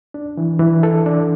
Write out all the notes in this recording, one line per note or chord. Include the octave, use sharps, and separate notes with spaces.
D4
E3
E3
A4
D4